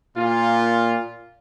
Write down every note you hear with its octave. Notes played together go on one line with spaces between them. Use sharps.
A#2 F4